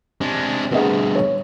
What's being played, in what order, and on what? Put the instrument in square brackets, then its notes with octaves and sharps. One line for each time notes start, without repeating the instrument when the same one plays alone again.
[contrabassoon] C3 [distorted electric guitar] G#3 D4
[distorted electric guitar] D2 G2 [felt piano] B3 G#4 D#5
[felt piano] C#5